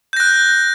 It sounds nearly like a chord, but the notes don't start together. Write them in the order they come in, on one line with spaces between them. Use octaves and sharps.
G6 A#6 F#6